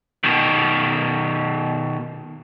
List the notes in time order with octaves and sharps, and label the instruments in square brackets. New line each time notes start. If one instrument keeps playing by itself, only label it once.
[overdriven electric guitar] B2 D#3